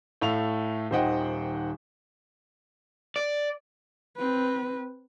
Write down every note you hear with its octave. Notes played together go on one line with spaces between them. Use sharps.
A2 A3 F5 F7
D#1 D#3 C5 D#5 F#5 G5
D5
C4 B4